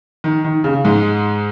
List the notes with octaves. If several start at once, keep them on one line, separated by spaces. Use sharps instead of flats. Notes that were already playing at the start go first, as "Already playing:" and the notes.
D#3
D#3
C#3
G#2 G#3